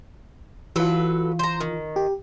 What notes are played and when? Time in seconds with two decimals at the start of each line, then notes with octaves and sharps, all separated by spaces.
0.76 E3 F#3 F4 A4 B4
1.39 C5 A#5
1.61 D#3
1.96 G4